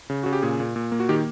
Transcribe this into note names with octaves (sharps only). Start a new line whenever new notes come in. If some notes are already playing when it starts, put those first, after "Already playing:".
C#3
C#3 F#4
G4
A#2 G#4
A#2
A#2
A#3
F#4
D#3 G4